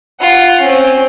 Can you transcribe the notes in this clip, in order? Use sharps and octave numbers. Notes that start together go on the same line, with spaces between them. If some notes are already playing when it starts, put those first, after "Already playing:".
F4 F#5
C4 C#4